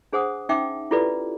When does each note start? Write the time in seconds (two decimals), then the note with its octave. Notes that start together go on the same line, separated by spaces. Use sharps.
0.13 D4 G#4 C5 F#5 G#5 D#6
0.49 C#4 D#4 E5 G5 D6
0.91 E4 F4 G4 A4 B4 D5